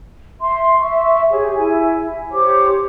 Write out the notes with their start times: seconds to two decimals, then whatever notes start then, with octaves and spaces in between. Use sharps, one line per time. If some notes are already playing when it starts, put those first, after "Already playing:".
0.41 E5 C6
0.81 E5 C#6
1.31 G4 G#4 C#5
1.56 E4 G#5
2.32 G4 C5 C#5 D6